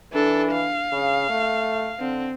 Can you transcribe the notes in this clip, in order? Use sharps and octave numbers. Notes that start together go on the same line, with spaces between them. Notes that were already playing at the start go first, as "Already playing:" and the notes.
E3 D4 A4
F5
C#3
A3
D3 C4